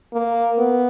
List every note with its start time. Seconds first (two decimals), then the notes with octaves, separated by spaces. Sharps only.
0.13 A#3
0.58 B3